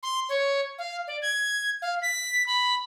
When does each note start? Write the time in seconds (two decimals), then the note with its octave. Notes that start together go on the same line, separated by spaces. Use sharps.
0.03 C6
0.29 C#5
0.78 F5
1.07 D5
1.22 G#6
1.82 F5
2.02 B6
2.47 B5